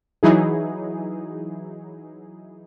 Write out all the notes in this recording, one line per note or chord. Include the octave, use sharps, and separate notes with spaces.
E3 F#3 D#4 E4 G#4